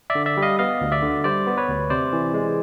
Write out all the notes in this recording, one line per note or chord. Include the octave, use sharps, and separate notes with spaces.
D5 E5
D3
D5 E5
G3
D#5 F5
B3 D#5 F5
D2
D5 E5
D3
G3 C5 D5
B3
B4 C#5
D2
C3 C5 D5
E3
G#3